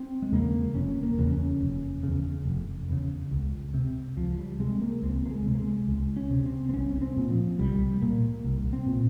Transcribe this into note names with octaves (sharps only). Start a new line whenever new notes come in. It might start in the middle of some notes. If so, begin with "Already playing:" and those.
Already playing: C4
G#3
E2 C#3 A#3
F1 C#4
A#3
E2 C#3
C#4
F1
E2 C#3
F1
E2 C#3
C#2
C3
C#2 F3
G3
C3 G#3
A#3
C#2 C4
A#3
G#3
C3
A#3
G#3
C#2
C#4
C3
C4
C4
C2 C#4
C#4
C4
A#2
F3
C2 G3
A#2 A#3
C2
C4
A#2